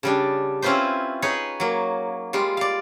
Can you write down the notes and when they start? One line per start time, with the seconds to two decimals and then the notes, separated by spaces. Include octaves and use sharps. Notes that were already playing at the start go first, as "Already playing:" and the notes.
0.03 C#3 G3 D4
0.62 C4 C#4 E4 F4 B4 C5
1.22 D#4 G#4 B4 C#5
1.60 F#3 A#3
2.33 G3 G#3 F4
2.57 D5 F5